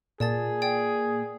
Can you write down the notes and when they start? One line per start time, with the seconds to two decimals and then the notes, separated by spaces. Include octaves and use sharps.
0.20 A#2 G#4 D5 A5 A6
0.62 D5 G5